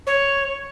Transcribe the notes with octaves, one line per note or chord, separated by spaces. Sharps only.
C#5